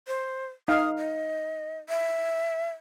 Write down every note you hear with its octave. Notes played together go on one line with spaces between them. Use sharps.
C5
D#4 F5 D#6
D#5
E5